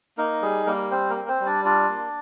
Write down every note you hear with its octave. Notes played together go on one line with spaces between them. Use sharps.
A#3 D#4 A#4
G3 G#4
G3 A#3 A#4
C4 C5
A#3 A#4
C4
C4 C5
G3
D4 D5
D4 F4 D5
A#3